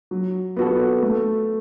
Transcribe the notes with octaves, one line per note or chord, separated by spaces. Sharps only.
F#3
B3 F#4 A4
A3